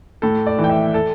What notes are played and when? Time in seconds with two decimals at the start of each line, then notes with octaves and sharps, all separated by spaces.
0.22 A2 A4
0.46 D5
0.59 E3
0.64 G5
0.70 E5
0.94 A4